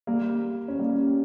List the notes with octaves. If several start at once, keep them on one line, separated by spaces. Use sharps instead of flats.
G3 A#3
C#4
G3 A#3